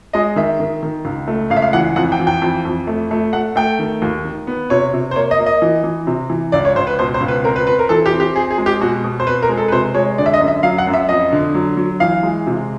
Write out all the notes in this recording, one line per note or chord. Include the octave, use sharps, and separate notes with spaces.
G#3 D#5
D#3 E5
D#3
D#3
C#2
A3
C#2 F5
E5
F5
E3 F#5
F2 F#5
G5
E3
G5
F2
F2
A3
A3
A3 F#5
A3 G5
D#3
D#2
D#3
B3
C3 C#5
C3
C5
A#3 C#5
D#5
A#3
D#5
E3
E3
C3
E3
C#2 D5
C#5
C#2 C5
B4
B2 C5
C5
C#2
B4
C4 A#4
B4
C4 B4
A#4
E3 A4
G4
C4
G4
C4 G#4
G#4
G#3
G4
B2 F#4
B2
C5
C4 B4
A#4
G#3
A4
B4
C3 C5
G#3 C#5
D3 D5
E5
D#5
F#2
E5
F#3 F5
F#5
F#2
E5
F2 D#5
D3
F#3
F#3
E3 F5
G#3
C3